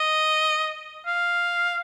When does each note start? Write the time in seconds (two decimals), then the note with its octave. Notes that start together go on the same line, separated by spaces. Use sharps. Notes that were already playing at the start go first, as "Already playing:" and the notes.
Already playing: D#5
1.06 F5